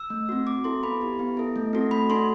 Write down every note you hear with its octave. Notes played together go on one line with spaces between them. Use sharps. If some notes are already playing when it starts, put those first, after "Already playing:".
Already playing: E6
A3
C4 F#4
C4 D6
E4 A4 C6
B3 B5
E4 G4
B3
E4 A4
A3
C4 F#4 A4
A3 B5
D4 F#4 A4 C6